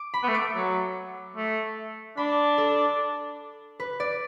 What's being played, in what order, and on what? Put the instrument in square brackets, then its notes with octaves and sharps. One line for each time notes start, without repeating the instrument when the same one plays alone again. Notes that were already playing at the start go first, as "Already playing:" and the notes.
Already playing: [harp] D6
B5
[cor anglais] B3
A3
[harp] D6
[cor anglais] F#3
A3
[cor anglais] D4 [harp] B5
[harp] A4
B4
D5